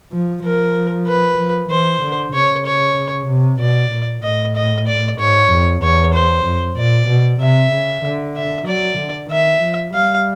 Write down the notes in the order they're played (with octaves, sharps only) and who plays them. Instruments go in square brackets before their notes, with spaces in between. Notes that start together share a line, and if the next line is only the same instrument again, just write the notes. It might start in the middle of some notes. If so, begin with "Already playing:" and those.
[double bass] F3
[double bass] F3 [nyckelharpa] A#4
[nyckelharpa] B4
[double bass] F3
[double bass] E3 [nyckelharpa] C5
[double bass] D3
[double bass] C#3 [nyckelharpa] C#5
[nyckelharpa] C#5
[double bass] C3
[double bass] B2 [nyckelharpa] D5
[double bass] A#2
[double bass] A2 [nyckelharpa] D#5
[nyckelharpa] D#5
D5
[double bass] G#2 [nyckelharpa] C#5
[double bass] F2
[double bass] E2 [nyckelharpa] C#5
[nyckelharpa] C5
[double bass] F2
[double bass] A#2 [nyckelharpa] D5
[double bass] B2
[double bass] C3 [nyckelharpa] E5
[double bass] C#3
D3
[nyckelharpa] E5
[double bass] F#3 [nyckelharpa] D5
[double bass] D3
[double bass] D#3 [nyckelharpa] E5
[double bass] F3
[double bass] G3 [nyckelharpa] F5